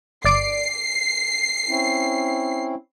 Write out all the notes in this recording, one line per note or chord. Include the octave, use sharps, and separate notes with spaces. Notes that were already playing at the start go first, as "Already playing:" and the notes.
G1 D5 C7 D7
C4 C#4 E4